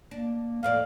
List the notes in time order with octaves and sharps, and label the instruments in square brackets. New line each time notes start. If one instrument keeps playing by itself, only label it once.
[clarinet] A#3 [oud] D4
[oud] F2 A2 D5 [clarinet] F5